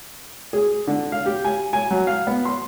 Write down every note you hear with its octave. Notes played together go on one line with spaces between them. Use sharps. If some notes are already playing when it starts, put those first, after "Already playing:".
G#4
D3
F5
G4
G#5
G#5
F#3
F5
B3
C6